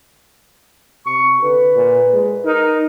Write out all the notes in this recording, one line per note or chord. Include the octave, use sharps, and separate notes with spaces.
C3 C#6
D3 B4
A#2
G#3
D#4 A#4